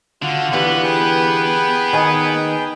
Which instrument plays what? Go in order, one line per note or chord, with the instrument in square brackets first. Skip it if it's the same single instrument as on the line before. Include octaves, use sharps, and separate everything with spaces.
[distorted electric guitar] D3 [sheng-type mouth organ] F4 F#4
[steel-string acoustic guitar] D3 E3 G4 [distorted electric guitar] B3
[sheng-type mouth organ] G#4 B4 G5
[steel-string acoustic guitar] D#3 D#5 G#5